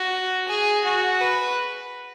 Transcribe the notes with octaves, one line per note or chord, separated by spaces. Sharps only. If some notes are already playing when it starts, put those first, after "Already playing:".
Already playing: F#4
G#4
F#4
B4